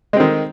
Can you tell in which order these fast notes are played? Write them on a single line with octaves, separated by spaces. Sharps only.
G#3 C4 D#3